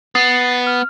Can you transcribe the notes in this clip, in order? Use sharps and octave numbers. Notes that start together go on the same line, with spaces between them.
B3 D#6 A6 C7
F6